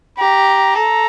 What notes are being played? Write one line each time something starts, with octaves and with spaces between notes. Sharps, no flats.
G4 A#5
A4 A#5